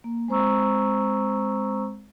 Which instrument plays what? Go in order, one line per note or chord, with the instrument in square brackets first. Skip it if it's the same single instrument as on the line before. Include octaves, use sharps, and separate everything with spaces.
[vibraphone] A#3
G#3 C4 C5 A#5 C#6 E6